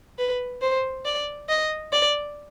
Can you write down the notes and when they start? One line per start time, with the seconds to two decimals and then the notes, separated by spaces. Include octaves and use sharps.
0.19 B4
0.62 C5
1.05 D5
1.49 D#5
1.93 D5